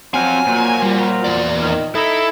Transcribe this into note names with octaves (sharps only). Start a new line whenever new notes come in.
F3 F#3 C4 F5 G#5
A#2
G3
E2 D5
D#3
D#4 E4 A4